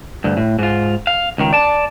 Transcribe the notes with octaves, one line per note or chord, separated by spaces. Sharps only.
D2 G2
A2
G#2 F4
F5
C#2 D#3
D5 A5